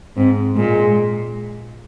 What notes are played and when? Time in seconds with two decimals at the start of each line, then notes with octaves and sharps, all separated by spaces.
0.17 G#2 C4
0.56 A#2 G#3